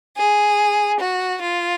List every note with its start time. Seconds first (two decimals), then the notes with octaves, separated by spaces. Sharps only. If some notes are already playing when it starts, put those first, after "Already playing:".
0.18 G#4
1.00 F#4
1.41 F4